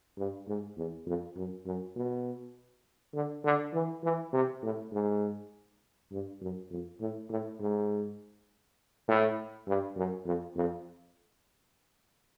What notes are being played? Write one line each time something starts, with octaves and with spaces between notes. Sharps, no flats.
G2
G#2
E2
F2
F#2
F#2
B2
D3
D3
E3
E3
C3
A2
G#2
G2
F#2
F2
A2
A2
G#2
A2
G2
F#2
F2
F2